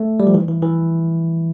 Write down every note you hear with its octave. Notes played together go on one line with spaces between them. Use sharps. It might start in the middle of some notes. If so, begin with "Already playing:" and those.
Already playing: A3
G3
F3
E3
E3
E3